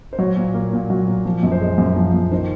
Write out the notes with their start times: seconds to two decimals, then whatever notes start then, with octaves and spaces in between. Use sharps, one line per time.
0.13 C5
0.19 F#3 C#5
0.37 A#2
0.54 A#3
0.73 A#2
0.90 F#3
1.08 A#2
1.25 F3
1.43 F#2
1.52 C5
1.61 G#3
1.78 F#2
1.96 F3
2.14 F#2
2.31 D#3 C5